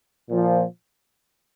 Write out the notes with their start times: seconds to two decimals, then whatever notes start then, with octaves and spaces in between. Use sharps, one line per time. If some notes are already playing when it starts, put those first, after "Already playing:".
0.28 A#2 F3